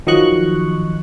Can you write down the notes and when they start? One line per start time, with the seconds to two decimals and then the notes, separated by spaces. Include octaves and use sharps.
0.07 D#3 F3 F#3 D#5 C#6 F#6